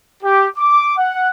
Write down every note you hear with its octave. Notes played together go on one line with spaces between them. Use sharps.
G4
D6
F#5